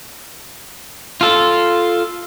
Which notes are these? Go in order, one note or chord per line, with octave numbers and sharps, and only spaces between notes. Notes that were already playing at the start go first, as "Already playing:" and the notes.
F4 A4